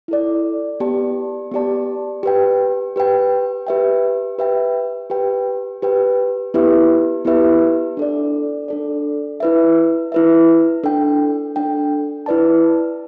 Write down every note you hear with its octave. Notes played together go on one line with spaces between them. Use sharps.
E4 A4 D5
B3 G4 D5 A5
B3 G4 D5 A5
G4 B4 G5
G4 B4 G5
G4 B4 E5 G5
G4 B4 E5 G5
G4 B4 G5
G4 B4 G5
B3 E4 G4 B4 E5
B3 E4 G4 B4 E5
D4 A4 D5
D4 A4 D5
E4 B4 E5
E4 B4 E5
D4 A4 G5
D4 A4 G5
E4 B4 D5 A5